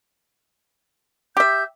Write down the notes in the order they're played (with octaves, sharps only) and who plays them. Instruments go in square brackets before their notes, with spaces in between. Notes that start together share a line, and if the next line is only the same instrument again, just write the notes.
[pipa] G4 E5 [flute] G6